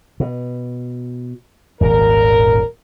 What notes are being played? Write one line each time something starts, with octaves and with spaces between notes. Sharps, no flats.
B2
D#1 G#1 A#2 A#4